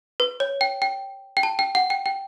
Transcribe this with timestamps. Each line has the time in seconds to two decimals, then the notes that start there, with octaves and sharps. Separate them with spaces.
0.20 B4
0.40 C#5
0.61 G5
0.82 G5
1.37 G5
1.43 A5
1.59 G5
1.75 F#5
1.90 G5
2.06 G5